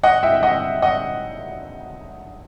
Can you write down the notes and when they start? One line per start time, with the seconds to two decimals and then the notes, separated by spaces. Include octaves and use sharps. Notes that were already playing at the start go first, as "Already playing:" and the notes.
0.03 D#5 F#5
0.23 E5 G5
0.43 D#5 F#5
0.82 D#5 F#5